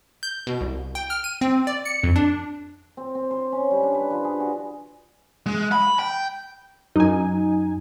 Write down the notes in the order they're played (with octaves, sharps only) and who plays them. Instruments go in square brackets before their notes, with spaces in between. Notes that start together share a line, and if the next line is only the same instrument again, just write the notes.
[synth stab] G6
B2
C2
G5
F6
D#7
C4
D5
C#7
F2
D4
[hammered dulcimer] C4
C4
C5
C#4
G3
D4
B4
F3
G#4
F#4
[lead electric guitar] G#3
B5
G5
[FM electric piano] F#2 [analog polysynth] D#4 G#5